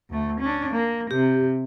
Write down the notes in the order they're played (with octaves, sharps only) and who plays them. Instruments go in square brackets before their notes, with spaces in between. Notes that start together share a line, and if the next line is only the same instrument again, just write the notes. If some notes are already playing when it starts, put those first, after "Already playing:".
[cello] D2 A3
C#4 D4
A#3
[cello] C3 [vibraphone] G4